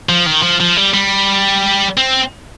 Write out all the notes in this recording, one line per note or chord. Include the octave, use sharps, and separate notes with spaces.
F3
D#3
F3
F3
G3
G3
C4